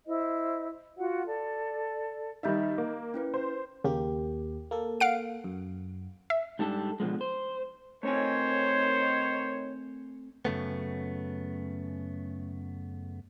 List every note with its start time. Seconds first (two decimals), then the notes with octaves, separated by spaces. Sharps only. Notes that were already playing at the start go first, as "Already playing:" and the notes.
0.06 E4 C5 D#5
0.98 F4 F#4 F#5
1.26 A4 D5
2.43 D#3 G3 D#4 D#5 E5 G6
2.78 A#3
3.14 C#4 E4 B4
3.34 C5
3.84 D#2 C#3 A#3 G4
4.71 A#3 A4
5.00 F5 F#5 D7
5.44 F#2
6.30 E5
6.59 G#2 G3 D4 A4
7.00 B2 D3 F3 G#3
7.21 C5
8.03 D#3 A3 C4 C5 C#5 G#5
10.45 F#2 C#3 A3 B3